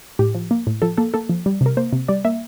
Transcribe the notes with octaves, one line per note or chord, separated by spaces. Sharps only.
A2 G4
F3
A#3
A2
F3 A4
A#3 A4
A#3 A4
F3
G3
C3 A#4
A#3 C5
C3
G3 D5
A#3 E5